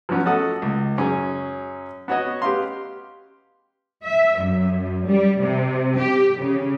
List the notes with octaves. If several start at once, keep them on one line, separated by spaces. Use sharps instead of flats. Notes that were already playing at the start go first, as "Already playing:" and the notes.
F3 F#3 B3 C#4
F#4 A4 D#5 F#5 D#6
C#2
F#2 C#4 G#4
B3 F#4 C#5 D#5
G4 B4 F5 C6
E5
F#2
G3
C3
G4
C#3